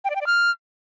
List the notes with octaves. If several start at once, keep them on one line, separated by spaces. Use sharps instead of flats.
G5
D5
G5
D5
F6